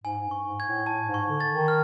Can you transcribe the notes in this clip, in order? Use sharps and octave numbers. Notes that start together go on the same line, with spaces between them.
G#2 G#5
G2
C#6
G#2
G#6
A2
A2 A5
G#2
C#6
D3
A6
D#3
F6